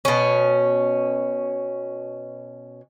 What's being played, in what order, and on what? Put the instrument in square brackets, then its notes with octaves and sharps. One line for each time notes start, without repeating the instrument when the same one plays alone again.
[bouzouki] B2 C#4